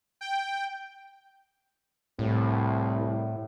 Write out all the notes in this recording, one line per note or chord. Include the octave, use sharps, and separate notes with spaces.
G5
C2 A2